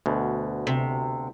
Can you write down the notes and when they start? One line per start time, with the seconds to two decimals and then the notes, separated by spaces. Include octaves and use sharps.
0.06 D2 B2
0.67 C3